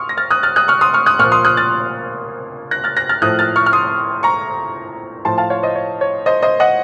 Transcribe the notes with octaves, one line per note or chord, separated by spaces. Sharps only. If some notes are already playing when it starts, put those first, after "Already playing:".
Already playing: C6 C#6 D#6 F6
A#6
F6 A6
D#6 F#6
F6 A6
D#6 F#6
C#6 F6
C6 D#6
C#6 F6
D#6 F#6
A#2 F3 C#6 F6
C6 D#6
D#6 F#6
F6 A6
F#6 A#6
F6 A6
F#6 A#6
F6 A6
A2 F3 D#6 F#6
F6 A6
C#6 F6
F6
C6 D#6
A#5 C#6
A2 F3 A5 C6
F5 A5
C#5 F5
C5 D#5
C#5
C#5
C5 D#5
C5 D#5
D#5 F#5